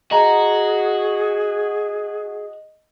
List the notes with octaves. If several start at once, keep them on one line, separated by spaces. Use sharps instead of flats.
F#4 G#4 D#5 G#5 A#5